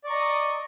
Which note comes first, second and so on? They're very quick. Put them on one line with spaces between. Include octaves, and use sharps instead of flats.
D5 C#6 A#5 D#5 D#6